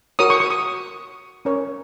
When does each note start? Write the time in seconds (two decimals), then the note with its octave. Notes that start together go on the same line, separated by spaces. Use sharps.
0.19 F#4 A#4 C#5 D#6
0.30 C#6
0.40 C#6
0.50 D#6
1.45 C#4 A#4 C#5